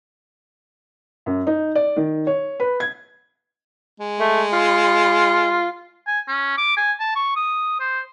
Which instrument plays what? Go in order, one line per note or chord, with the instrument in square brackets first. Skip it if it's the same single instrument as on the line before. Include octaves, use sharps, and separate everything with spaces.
[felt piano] F#2
D#4
D5
D#3
C#5
B4
G#6
[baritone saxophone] G#3
[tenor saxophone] A3
F4
[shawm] G#5
C#4
D6
G#5
A5
C#6
D#6
C5